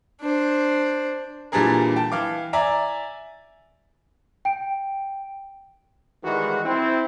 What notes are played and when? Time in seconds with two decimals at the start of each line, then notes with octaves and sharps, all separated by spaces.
0.21 D4 C5
1.52 A#2 E3 G3 D4 G#4 A#4
1.96 G5 A5
2.12 E3 F5 D6
2.53 D5 E5 G#5 A#5
4.45 G5 D7
6.24 D#3 E3 G3 G#3 F#4
6.65 C4 E4